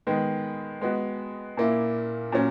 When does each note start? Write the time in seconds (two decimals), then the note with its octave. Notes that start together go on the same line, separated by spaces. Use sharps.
0.07 D#3 G#3 B3
0.81 G#3 B3 F#4
1.57 A#2 A#3 E4
2.32 A#2 F#3 C#4